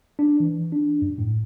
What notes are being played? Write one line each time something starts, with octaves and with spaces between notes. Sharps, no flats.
D4
E3
D4
F#2
A2